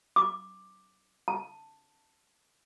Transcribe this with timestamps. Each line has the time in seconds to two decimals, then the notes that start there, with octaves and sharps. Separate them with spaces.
0.16 D6
1.28 A5